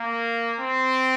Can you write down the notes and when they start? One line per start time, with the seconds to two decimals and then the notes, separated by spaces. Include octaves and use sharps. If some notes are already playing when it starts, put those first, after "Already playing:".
Already playing: A#3
0.60 C4